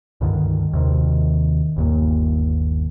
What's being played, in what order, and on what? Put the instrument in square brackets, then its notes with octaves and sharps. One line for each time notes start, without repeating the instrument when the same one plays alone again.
[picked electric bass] C#2 G2 D3 D#3
D#2 C3 D#3
G1 D#2 A#2